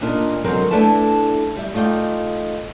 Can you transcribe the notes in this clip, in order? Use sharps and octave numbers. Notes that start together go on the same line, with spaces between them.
A#2 D4 D#4 A#4
D3 F#3 G#3 C4 A#4
A3 D4 E4 A4 B4 A5
G3 E5
A3 D#4 F4 D5 G5